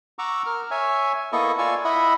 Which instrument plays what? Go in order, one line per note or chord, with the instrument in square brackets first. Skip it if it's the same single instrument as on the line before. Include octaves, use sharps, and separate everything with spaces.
[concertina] F#5 A#5 C#6 D6 E6
A#4 F6
C#5 E5 G#5
A#3 B3 E4 A4 D#5 C#6
F4 D5 G#5 C#6 E6
E4 D#5 E5 F#5 B5